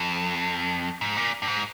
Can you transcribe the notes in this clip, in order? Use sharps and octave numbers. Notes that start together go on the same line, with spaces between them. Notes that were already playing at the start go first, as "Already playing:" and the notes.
Already playing: F2
G#2
A#2
G2
G#2